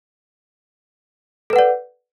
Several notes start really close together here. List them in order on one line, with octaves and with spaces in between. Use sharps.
A4 B4 F#5 D5